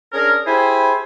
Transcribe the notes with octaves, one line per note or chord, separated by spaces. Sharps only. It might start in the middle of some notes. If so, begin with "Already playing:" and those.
C#4 D4 G#4 A#4
E4 G4 G#4 C5 G#5 B5